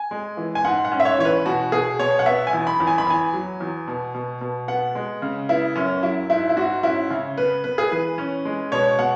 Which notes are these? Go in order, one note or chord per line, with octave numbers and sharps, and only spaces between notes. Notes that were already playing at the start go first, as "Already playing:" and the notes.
Already playing: G#5
G#3
E3
G#5
G#2 F#5
F#5
C#4
E5
C#5
E3 C#5
B4
B2 F#4
B2 G#4
B2 C#5
F#5
B3 E5
G#5
E2
B5
E2
G#5
B5
E2 G#5
F#3
E2
B2
B2
B2
B3 F#5
G#3
C#3
B3 E4
F#2 C#4
F#3 E4
G#2 E4
E4
G#2 F#4
C#4 E4
C#3
B3 B4
B3 B4
G#4
E3 B4
C#4
G#3
B2 C#5
B2 F#5